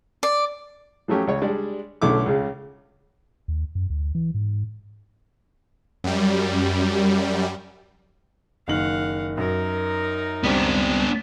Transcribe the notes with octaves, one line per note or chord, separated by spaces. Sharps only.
D5
F3 F#3 A3 C#4 G4
C#2 C#5
G3 G#3 D4
B1 D3 A3 C#4 E4 D6
C#2 C#3
D#2
F#2
D2
E3
G#2
F#2 G3
F#1 D#3 F5 F#5 F#7
F#2 D#4 A#4
C#2 G3 B3 C4 D4